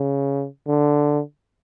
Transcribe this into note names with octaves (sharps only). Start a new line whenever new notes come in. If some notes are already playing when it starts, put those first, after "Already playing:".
Already playing: C#3
D3